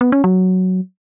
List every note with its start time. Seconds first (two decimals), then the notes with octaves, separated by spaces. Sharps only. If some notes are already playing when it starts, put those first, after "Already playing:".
0.01 B3
0.12 C#4
0.24 F#3